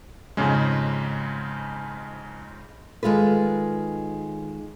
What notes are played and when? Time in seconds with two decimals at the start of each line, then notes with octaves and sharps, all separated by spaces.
0.37 F2 G#2 C#3 G#3
3.03 D#3 G#3 F4 A4 B4